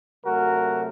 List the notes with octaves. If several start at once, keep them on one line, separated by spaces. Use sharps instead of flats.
C3 F#3 A3 F#4 A#4